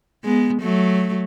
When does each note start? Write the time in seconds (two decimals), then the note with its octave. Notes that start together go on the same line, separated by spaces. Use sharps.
0.25 G#3 B3
0.62 F#3 A3